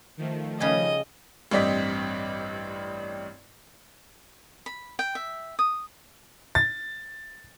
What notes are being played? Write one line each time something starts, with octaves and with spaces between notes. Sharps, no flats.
D#3 F3 A3
C#3 G3 G#4 D#5
A1 G2 C4 D5 D#5 B6
B5
G5
E5
D#6
A6